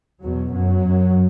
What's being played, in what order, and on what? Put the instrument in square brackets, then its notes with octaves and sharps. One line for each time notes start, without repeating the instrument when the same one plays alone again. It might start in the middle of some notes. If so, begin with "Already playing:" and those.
[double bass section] E2 B2 F#3
F#2 F#3
F#2